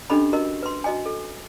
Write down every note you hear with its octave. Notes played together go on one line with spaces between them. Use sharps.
C#4 D4 G4 A4 D#5 B5
F#4 A#4 D#5
B4 C6
F#4 D#5 G#5
A4